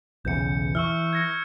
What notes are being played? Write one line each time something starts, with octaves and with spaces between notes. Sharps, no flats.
B1 E2 C#3 G6 C#7
E3 C#6 E6 F6
G#6 A#6 C#7